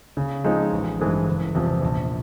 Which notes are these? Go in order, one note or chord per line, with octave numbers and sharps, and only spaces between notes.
C#3
F3 G#3 C4 D#4
A1
G2 E3 G#3 C4
F#1
E2 C3 F3
A#1